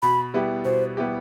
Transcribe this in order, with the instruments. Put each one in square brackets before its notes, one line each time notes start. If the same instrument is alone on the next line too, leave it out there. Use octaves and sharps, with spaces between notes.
[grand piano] B2 [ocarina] B5
[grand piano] G3 B3 E4 G4
[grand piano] B2 [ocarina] C5
[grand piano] G3 B3 E4 G4